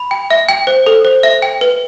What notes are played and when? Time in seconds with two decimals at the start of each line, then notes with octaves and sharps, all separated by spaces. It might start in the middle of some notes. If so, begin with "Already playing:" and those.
Already playing: B5
0.11 G5
0.31 E5
0.49 G5
0.67 C5
0.86 A4
1.05 C5
1.23 E5
1.42 G5
1.61 B4